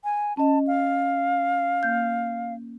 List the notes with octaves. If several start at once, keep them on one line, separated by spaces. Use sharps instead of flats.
G#5
C#4 D#5 A5
F5
A#3 G6